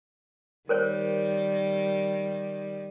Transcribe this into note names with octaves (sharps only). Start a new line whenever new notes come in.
D#3 G3 A#4 C5 C#5